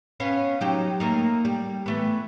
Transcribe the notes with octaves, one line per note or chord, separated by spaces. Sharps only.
B3 C#4 F5
F#3 D#4 G4
A3 A#3 D#4
G3
E3 A3 B3